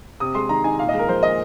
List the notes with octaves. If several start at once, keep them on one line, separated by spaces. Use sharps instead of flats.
C3 D#6
G#3 C6
D#3 A#5
D#4 G#5
A#2 F5
D#5
G#3 A#4
F3 C5
A#2 D#5